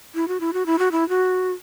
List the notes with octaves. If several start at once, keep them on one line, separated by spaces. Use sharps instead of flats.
E4
F#4
E4
F#4
E4
F#4
E4
F#4